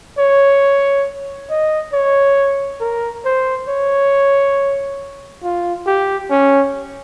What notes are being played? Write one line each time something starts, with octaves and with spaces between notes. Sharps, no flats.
C#5
D#5
C#5
A#4
C5
C#5
F4
G4
C#4